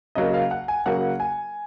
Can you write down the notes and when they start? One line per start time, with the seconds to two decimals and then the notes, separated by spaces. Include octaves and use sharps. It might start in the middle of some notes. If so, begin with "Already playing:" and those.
0.15 C#3 F#3 A#3 D#5
0.34 F5
0.51 F#5
0.68 G#5
0.86 C#3 F#3 A#3 F#5
1.20 G#5